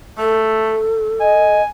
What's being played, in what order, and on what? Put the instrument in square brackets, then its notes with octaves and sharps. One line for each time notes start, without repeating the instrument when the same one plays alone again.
[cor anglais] A3 [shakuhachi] A4
[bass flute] D#5 [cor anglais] G#5